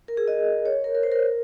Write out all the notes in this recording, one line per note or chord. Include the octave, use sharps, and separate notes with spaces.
A#4
G#4
D#5
C#5
A#4
A#4
C5
A#4